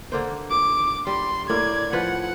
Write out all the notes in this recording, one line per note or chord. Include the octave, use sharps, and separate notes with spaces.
D3 A#3 C5
D6
G3 C6
A2 A#3 D5 G#6
F3 B4 F#5